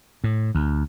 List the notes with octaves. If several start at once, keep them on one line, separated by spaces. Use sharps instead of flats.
A2
D2